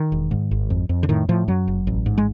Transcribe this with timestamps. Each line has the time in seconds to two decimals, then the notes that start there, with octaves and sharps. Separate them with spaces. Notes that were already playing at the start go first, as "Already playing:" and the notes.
Already playing: D#3
0.12 E1
0.31 G#2
0.51 G#1
0.70 F2
0.89 F2
1.03 D3
1.09 A2 D#3
1.29 A2 F3
1.48 F#2 F#3
1.68 F#1
1.87 A1
2.06 G#2
2.18 G#3